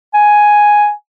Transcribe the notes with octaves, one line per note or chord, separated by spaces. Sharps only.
G#5